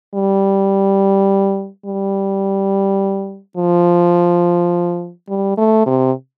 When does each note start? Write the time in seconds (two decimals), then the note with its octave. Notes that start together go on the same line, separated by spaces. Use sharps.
0.14 G3
1.85 G3
3.57 F3
5.29 G3
5.57 A3
5.86 C3